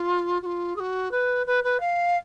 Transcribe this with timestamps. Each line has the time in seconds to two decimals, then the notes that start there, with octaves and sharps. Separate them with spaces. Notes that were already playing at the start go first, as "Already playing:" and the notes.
Already playing: F4
0.42 F#4
0.46 F4
0.76 G#4
0.80 F#4
1.11 B4
1.46 B4
1.64 B4
1.80 F5